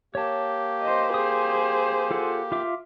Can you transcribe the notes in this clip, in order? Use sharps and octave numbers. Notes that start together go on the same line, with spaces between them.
A#3 G4 C#5 A5
C5 D#5
G#4 C5 D#6
F4 A4 F#5
F4 E5 D6